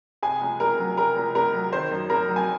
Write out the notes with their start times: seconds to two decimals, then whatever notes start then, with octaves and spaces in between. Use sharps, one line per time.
0.22 C3 G#4 G#5
0.41 C#2
0.60 C#2 A#4 A#5
0.79 F#3
0.97 C3 A#4 A#5
1.16 C#2
1.35 C#2 A#4 A#5
1.53 F#3
1.73 D#3 C5 C6
1.91 F#2
2.10 F#2 A#4 A#5
2.29 F#3
2.36 G#5